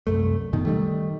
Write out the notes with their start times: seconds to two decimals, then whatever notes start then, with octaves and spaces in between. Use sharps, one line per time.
0.07 C2 F#2 A3
0.53 F#2 B2 D#3
0.65 D#3 F3 G3 A3